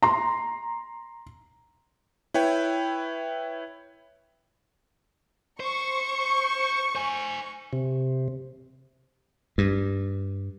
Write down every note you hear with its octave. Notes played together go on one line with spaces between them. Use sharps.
A#5 C6
E4 B4 C#5 G5
C5 C#6
C5 G#5
C3
G2